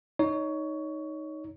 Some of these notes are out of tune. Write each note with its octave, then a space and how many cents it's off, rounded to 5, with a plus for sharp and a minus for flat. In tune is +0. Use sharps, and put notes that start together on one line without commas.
D#4 +5 C#5 +20